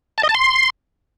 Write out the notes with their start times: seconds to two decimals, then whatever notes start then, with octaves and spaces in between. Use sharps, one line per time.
0.18 A5
0.23 D#5
0.29 A5
0.35 C6